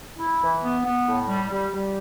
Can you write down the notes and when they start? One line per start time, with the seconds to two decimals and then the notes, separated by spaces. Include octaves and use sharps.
0.18 E4
0.41 E3
0.62 B3
0.85 B3
1.06 A2
1.28 G3
1.50 G3
1.73 G3